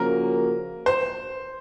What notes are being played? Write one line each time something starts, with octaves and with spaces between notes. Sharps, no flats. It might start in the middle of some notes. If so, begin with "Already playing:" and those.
Already playing: C#3 F3 A#3 C#4 F#4 A#4
C5